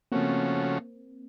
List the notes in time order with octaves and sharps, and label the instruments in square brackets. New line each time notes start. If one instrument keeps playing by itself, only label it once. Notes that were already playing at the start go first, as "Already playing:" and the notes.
[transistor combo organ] C#3 F3 A3 C#4 F#4 [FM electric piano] A#3 C4